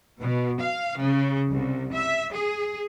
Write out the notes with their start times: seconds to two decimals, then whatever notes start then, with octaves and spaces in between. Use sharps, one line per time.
0.18 B2
0.61 F5
0.99 C#3
1.52 C2
1.94 E5
2.35 G#4